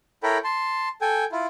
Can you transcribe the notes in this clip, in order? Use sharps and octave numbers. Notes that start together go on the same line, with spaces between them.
E4 A4 A#4 C#5 G5 B5
A5 C6
A4 G5 G#5
E4 F4